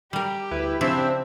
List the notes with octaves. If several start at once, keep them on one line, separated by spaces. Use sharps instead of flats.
G3 G4 A#4
D2 E4 B4
C#3 F3 C4 D4 E4 C5 E5